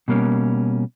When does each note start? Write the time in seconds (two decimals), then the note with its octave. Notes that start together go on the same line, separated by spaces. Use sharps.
0.08 B2 G3 A#3 C#4